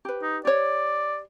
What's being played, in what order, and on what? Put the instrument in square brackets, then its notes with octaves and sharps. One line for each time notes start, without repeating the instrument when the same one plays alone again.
[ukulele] G4 B4
[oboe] D#4
[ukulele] G4 C#5 [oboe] D5